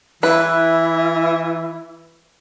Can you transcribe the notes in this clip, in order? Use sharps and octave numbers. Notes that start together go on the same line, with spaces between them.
E3 E4 B4